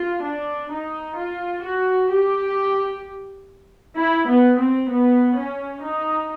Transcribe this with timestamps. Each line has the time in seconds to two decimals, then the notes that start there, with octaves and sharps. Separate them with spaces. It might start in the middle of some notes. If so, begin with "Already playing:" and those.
Already playing: F4
0.23 D4
0.70 D#4
1.16 F4
1.63 F#4
2.10 G4
3.96 E4
4.27 B3
4.59 C4
4.90 B3
5.36 C#4
5.83 D#4